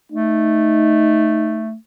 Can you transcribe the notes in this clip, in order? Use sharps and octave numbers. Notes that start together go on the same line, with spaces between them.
A3 D#4